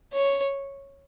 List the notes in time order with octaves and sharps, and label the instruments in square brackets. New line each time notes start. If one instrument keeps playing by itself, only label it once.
[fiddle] C#5